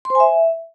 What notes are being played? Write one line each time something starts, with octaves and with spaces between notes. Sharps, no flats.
C6
C5
G#5
E5